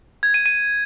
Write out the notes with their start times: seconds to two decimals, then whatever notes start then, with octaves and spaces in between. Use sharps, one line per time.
0.23 G#6
0.34 D#7
0.46 D#7